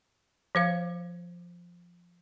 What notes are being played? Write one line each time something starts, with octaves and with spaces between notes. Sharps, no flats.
F3 C5 F5